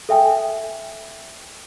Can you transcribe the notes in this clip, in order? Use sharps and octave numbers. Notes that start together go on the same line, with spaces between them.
A4 E5 G5 G#5